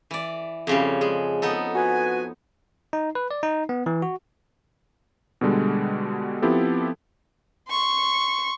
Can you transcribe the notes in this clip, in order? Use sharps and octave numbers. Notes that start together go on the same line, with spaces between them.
E3 D5
F2 C#3 G3
G#3
B3 D#4 A4
F#4 B4 G#5
D#4
B4
D5
D#4
B3
E3
F#4
B2 D3 G3 G#3
F3 B3 C4 E4 G4 A4
C6 C#6